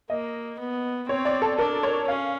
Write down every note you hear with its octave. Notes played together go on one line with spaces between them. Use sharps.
A#3 D#5
B3
C4 C#5
D5
A4
D4 A#4
C#5
C#4 F5